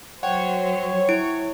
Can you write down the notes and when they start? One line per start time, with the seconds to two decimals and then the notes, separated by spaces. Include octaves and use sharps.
0.23 F#3 C5 C#5 F#5 G5
1.09 E4 D7